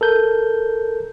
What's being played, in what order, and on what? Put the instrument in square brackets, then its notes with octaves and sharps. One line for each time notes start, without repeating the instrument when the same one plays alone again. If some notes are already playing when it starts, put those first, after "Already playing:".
[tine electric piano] A4 A#4 G6